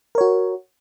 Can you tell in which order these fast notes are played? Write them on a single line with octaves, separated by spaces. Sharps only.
A#4 C#5 F#4